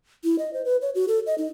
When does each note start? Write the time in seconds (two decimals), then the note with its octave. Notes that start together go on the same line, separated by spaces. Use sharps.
0.24 E4
0.39 D#5
0.53 C5
0.65 B4
0.82 C#5
0.95 F#4
1.08 A4
1.26 D#5
1.38 D#4